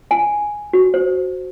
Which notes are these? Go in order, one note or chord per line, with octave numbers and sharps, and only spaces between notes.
G#5
F#4
C5